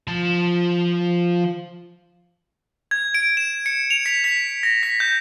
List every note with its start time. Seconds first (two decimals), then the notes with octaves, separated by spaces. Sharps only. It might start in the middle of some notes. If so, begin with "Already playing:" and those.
0.08 F3 A5
2.91 G#6
3.14 D7
3.37 E7
3.66 C#7
3.90 F7
4.06 B6
4.24 B6
4.63 A#6
4.83 B6
5.00 G6